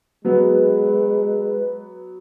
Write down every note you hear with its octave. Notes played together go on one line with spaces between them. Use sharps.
F#3 G#3 B3 B4